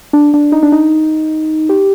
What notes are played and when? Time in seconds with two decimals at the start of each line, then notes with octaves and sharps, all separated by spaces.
0.13 D4
0.34 D4
0.52 D#4
0.63 D4
0.72 D#4
1.69 G4